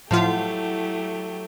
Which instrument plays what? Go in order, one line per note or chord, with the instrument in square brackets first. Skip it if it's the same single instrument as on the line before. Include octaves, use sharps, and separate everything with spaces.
[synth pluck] A2 F3 F4 [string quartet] F#3 A3 G4 [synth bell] E4 F#5